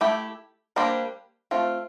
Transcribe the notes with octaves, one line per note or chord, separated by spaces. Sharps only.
A3 E4 G4
G3 A#3 D4 G4 C5
A3 C4 F4